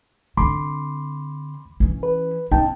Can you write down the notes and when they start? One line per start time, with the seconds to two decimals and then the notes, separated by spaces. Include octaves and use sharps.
0.37 D3 C4 B5 C6 D6
1.80 E3 C#4
2.03 B4
2.51 B3 C#4 D#4 G5 A5